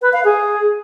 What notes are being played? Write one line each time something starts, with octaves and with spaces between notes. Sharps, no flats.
B4
F5
G#4